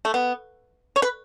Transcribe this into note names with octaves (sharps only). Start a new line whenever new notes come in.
A3
B3
C#5
B4